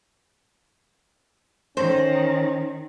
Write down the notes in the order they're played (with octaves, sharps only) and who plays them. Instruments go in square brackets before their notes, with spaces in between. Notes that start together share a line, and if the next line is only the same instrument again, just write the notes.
[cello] D#3 [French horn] C#4 [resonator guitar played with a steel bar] C5